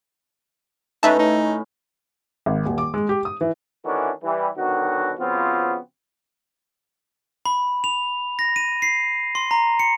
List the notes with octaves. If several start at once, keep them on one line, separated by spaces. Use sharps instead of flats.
A2 C#4 D#4 B4 E5 A5
D#4
G#1
D#1
D6
G#3
G4
D#6
E3
D#3 E3 A3 C#4 D4 F#4
E3 G3
B2 D3 D#3 F#3 F#4
C#3 F3 B3 C4 F4 F#4
B5
F7
A#6
D#7
C7
C6
A#5
C#7